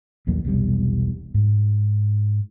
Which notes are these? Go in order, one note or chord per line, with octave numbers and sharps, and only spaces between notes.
A#1 D#2 F#3 A#3
E1 B1 C3 G3
G#2